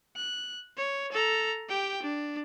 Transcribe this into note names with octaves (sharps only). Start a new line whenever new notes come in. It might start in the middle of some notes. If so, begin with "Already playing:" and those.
F#6
C#5
A4 A#5
G4 G5
D4